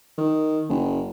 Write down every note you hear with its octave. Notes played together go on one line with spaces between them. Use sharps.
D#3
F#1